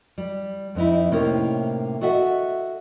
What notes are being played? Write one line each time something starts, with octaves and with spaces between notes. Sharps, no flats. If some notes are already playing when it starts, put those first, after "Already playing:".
G3
F2 C4 D#4 E4
A2 C3 A#3 C#4 D#4 A#4
F#4 A4 D#5 E5 F#5